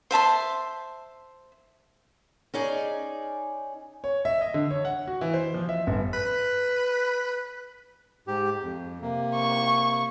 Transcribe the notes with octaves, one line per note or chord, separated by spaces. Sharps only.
C5 E5 A5 C6
C#4 D#4 G#4 D5 G#5
C#5
E5
D#5
D3
C#5
F#5
F#4
E3
C5
F3
E5
G1
B4
G#2 G4
F2
C3 A#3
C#6